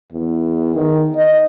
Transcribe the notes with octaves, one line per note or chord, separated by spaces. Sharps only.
E2
D#3
D#5